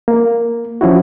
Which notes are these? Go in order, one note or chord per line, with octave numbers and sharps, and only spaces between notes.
A#3
F3 C#4 E4 F#4